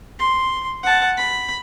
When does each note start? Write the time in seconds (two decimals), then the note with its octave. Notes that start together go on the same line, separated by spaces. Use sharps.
0.19 C6
0.83 F#5 A5
1.17 B5